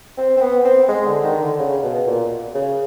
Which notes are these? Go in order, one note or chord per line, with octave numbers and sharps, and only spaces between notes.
C4
C4
B3
C4
G#3
D3
D#3
D3
C#3
B2
A#2
C#3